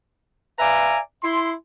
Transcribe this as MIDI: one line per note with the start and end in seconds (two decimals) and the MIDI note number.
0.59 0.99 71
0.59 0.99 74
0.59 0.99 76
0.59 0.99 77
0.59 0.99 80
0.59 0.99 82
1.23 1.52 64
1.23 1.52 84